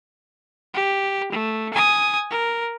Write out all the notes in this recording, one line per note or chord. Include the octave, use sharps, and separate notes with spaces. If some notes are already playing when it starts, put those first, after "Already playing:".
G4
A3
G#5 D#6
A#4